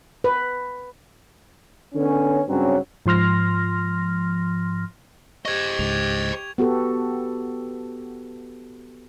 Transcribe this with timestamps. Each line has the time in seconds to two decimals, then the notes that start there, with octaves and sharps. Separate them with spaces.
0.24 B4
1.95 D3 B3 C#4
2.48 G2 C#3 F#3 C4 C#4
3.06 G#2 F3 C6 F6 A#6
5.45 G4 C5 D#5 C#6 G#6
5.79 C#2 G#2 F7
6.58 B3 F#4 G4 A4